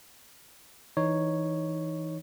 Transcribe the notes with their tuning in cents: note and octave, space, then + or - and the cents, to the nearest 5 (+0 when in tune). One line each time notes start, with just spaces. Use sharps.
E3 -10 D#4 +0 C#5 +0